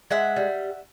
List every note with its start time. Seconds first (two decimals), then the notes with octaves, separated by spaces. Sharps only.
0.11 G#3 E5 F#5
0.36 G3